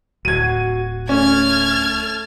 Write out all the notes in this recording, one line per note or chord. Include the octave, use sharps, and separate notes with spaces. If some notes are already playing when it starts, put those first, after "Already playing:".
D1 F#4 G#6 D#7
A3 C#4 A5 F6 G#6